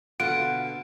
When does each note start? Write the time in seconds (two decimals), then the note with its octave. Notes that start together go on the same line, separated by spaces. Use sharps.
0.20 B2 D3 F4 F#5 D7